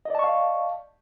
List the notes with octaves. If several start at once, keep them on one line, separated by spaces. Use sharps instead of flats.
D5 D#5 F5 A5 C#6